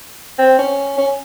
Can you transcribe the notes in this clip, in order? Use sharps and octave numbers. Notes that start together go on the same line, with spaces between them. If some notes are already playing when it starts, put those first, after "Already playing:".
C4
C#4
C#4